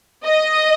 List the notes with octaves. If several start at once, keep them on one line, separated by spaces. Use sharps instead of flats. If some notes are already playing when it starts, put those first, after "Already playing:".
D#5